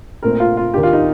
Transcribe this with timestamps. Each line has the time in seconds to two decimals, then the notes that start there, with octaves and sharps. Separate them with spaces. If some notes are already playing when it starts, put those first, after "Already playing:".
0.23 A#1 A#2 A3 C4 A#4
0.40 F4
0.57 F4
0.74 D#2 D#3 A#3 D4 G4
0.83 F4
0.93 D#4